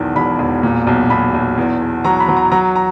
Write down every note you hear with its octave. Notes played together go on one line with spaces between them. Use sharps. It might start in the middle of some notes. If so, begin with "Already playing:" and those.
Already playing: B1 E2 D#3
E1 B5
E1
A#2
B1
B1 B5
B1
E2
E2
F#3 A#5
B5
F#3
A#5
F#3 A#5
A#5